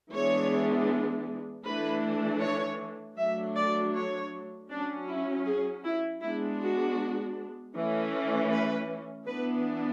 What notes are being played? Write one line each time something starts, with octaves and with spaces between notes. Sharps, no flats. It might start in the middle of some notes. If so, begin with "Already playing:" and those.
E3 G#3 B3 D4 C#5
E3 A3 D4 B4
C#5
F#3 A3 D4 E5
D5
C#5
F#3 C#4 D4
E4
G#4
E4
G#3 B3 D4 E4
F#4
E3 A3 C#4
B4
E3 B3 D4 B4